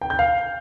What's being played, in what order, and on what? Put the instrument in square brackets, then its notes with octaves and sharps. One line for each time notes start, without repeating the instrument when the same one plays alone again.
[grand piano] G5
G6
F5